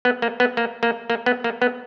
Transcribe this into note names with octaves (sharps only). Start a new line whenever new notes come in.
B3
A#3
B3
A#3
A#3
A#3
B3
A#3
B3